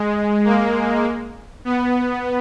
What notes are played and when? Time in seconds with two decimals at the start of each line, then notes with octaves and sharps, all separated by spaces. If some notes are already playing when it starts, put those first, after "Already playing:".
Already playing: G#3
0.45 A#3
1.65 B3